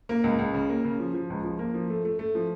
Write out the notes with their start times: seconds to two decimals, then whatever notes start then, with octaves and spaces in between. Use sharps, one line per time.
0.09 A#3
0.24 C#2
0.39 C#2
0.54 C#3
0.70 A#3
0.84 C#3
1.00 F3
1.14 F3
1.30 C#2
1.44 F3
1.59 A#3
1.74 F3
1.90 A3
2.05 A3
2.19 A3
2.35 F3